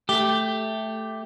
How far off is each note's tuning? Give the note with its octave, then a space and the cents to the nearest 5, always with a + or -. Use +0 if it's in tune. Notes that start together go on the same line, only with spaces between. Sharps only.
A3 +0 G4 +0